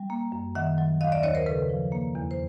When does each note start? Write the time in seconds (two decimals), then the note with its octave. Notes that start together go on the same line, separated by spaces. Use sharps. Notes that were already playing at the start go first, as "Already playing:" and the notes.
Already playing: G3
0.10 A#3
0.32 F#2
0.55 D#3 E5 F#5
0.78 F#3
1.01 D#2 D#5 F5
1.12 D5 E5
1.23 D#2 C#5 D#5
1.35 A#4 C5
1.46 C#3 A4 B4
1.69 F3
1.92 A#3
2.15 E2
2.31 C5